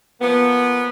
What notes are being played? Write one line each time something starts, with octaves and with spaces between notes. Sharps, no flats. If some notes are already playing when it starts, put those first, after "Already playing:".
F3 A#3 B3